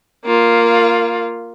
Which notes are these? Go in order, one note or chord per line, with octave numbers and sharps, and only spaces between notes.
A#3 F4